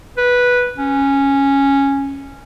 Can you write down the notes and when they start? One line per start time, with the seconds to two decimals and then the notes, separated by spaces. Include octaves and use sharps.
0.17 B4
0.78 C#4